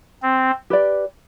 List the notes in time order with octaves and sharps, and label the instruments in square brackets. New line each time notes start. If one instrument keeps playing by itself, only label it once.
[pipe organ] C4
[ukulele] G4 B4 D5